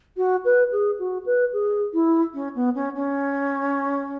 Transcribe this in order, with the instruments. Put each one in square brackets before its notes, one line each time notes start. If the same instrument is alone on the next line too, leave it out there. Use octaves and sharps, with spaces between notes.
[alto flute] F#4
B4
G#4
F#4
B4
G#4
E4
C#4
B3
C#4
C#4